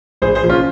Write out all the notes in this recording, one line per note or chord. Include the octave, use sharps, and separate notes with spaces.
A#1 G#4 C5
G#4 C5
A#2 F3
C#4 F4